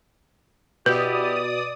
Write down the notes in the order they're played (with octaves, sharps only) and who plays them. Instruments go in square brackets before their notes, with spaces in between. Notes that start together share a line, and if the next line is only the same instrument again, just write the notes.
[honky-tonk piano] B2 [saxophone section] B3 E4 G4 [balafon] B4 [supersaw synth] D5 D#6